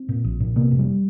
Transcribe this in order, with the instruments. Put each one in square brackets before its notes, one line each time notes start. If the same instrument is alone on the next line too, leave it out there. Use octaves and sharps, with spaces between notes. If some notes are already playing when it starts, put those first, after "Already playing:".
Already playing: [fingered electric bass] C4
A#2
A#1
A#2
C3 A#3
F1
G3